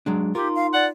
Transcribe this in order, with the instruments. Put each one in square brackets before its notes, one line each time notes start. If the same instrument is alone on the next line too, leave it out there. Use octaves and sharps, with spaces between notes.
[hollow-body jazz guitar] F#3 G#3 D4
[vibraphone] D#4 C6 [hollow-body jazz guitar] F4 A#4 [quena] G4
[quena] F5
[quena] D5 [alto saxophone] F#5